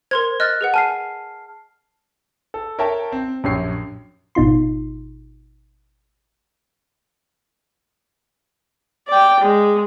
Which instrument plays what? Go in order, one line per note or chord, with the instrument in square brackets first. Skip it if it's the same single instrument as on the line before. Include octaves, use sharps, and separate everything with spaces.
[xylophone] A#4 C6 G#6 [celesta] C5
[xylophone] D#5 F6 A6 [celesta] F#6
[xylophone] G#4 B4 F#5
[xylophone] G#5 [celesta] A5 F6 C7
[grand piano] A4
A#4 C#5 E5 G5 A5
C4
A#1 F#2 G4 C#5 C7
[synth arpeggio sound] G#1 B2 D#4 F4 C6
[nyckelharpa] D5 G5
G#3